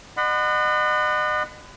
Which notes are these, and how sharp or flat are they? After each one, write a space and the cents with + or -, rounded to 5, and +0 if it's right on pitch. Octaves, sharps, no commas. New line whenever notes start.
D#5 -40 F#5 +0 B5 +35